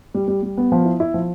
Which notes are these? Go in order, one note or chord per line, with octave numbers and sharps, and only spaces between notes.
G3
G3
G3
B3
F3
E4
E4
F3